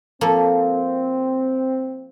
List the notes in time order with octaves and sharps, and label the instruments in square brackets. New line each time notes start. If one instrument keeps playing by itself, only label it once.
[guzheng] F3 A#3 A4 [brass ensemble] C4